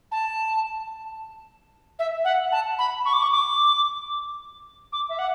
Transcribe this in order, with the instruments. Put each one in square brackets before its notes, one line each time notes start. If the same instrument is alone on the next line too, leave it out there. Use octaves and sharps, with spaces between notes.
[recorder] A5
E5
F#5
A5
B5
C#6
D6
C#6
D6
D6
E5
F#5